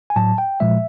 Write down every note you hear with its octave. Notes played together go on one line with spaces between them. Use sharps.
G#5
A2 F#3 A5
G5
A#2 F3 G#3 E5